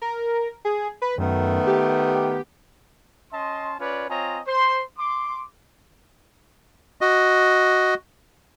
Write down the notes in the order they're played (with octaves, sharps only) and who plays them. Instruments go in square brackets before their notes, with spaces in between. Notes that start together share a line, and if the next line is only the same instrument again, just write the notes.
[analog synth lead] A#4
G#4
B4
[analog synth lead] F#2 [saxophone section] D#3 A3 B3
[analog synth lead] G4
[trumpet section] C#4 D#5 A5 C6
C#4 F4 B4 C#5 D5
C4 F4 C#5 D#5 G#5 A#5
C5 C6
C6 D6
[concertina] F#4 D#5